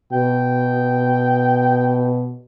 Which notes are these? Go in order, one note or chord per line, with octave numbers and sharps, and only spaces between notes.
B2 G5